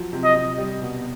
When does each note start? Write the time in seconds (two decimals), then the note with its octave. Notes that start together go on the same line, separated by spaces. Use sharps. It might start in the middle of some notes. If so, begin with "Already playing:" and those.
Already playing: F3 F#3
0.13 C3
0.24 D#5
0.35 C3
0.58 G3
0.82 B2